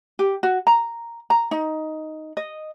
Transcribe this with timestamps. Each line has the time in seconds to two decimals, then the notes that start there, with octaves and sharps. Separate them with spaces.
0.19 G4
0.43 F#4
0.67 A#5
1.30 A#5
1.51 D#4
2.37 D#5